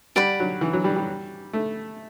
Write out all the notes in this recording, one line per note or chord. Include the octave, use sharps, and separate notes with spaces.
G3 D5 F#5 B5
F#3
E3
F#3
G3
G3
A3